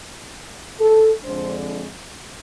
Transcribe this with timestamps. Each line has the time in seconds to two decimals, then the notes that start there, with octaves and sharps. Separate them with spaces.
0.80 A4
1.23 F2 D3 G#3 D4 C5